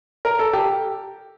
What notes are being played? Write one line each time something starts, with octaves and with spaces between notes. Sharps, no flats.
A#4
A4
G4